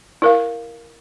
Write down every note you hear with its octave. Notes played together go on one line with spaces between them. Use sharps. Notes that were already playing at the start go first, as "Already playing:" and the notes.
E4 A#4 F5